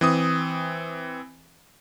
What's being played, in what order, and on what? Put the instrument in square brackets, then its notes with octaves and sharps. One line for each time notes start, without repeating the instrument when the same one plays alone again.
[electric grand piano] E3 C4 D#6